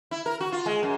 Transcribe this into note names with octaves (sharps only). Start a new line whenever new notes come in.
E4
A#4
F#4
F4
G#3
F#2